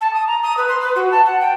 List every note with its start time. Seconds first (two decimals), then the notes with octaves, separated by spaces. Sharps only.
0.01 A5
0.13 D#6
0.27 A#5
0.43 D#6
0.57 B4
0.68 C6
0.80 B4
0.95 F#4
1.11 A5
1.25 F#5
1.40 G5